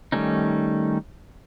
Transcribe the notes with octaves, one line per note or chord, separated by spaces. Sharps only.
D#3 G3 A3 C#4 D#4